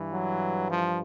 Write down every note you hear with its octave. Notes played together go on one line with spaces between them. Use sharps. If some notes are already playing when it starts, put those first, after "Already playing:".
Already playing: G2 E3
F#3
F3